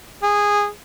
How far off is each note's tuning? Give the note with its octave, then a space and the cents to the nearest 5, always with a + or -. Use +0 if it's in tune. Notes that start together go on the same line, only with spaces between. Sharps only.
G#4 -15